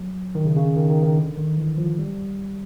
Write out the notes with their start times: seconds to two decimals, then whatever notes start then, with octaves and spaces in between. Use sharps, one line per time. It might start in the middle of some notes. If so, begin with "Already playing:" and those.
Already playing: F#3
0.35 D#3
0.45 C#3
0.56 C#3
0.76 D#3
0.90 D#3
1.03 D#3
1.17 D3
1.37 D#3
1.58 E3
1.78 F3
1.99 G3